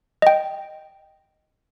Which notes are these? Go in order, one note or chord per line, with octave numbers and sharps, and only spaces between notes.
D#5 G5